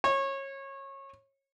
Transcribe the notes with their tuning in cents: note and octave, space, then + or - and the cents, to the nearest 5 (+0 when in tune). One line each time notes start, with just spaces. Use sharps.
C#5 -25